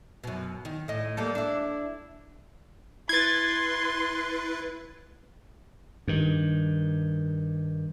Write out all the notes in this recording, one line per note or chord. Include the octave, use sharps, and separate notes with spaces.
F#2 B2
D#3
A2 D#5
G3 A#3 A4
D4 E4
E4 B4 C6 G#6 A6
G2 D#3